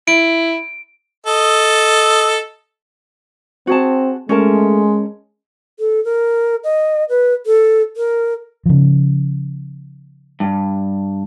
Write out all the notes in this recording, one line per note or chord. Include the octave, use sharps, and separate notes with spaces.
E4 D7
A4 D#5
C4 F#4 G#4 A5
G#3 A3 C#4 A#4 A5
A4
A#4
D#5
B4
A4
A#4
C#3 F3
G2